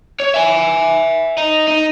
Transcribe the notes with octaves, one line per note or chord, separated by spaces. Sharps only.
C#5
E5 G#5
D#4
D#4